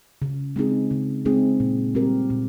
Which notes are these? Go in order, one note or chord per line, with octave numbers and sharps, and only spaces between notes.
C#3
G#3 C4 D#4 G#4
C#3
G#3 C4 D#4 G#4
A#2
G3 C4 G4 A#4
A#2